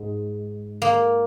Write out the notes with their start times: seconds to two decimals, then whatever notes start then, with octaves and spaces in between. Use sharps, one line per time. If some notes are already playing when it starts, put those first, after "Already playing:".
Already playing: G#2 G#3
0.82 A#3